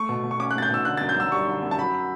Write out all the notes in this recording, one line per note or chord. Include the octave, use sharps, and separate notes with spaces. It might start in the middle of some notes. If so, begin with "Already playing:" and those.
Already playing: A3 C#6
B2
B2
C#6
C#4 D6
F#6
A3 A6
G6
B2 E6
D3 F#6
A6
F#2
G6
F#2 E6
G3 C#6
D3
F#2
A5
F#3 B5